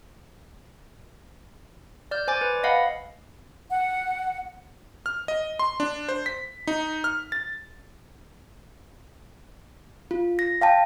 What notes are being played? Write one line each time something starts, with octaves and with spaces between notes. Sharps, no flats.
D5 F6 G6
C5 G#5 D6 A6
B4
D#5 F5 F#5 B5
F#5
F6
D#5
C6
D4
C5
B6
D#4
F6
A6
F4
A#6
F5 G5 A5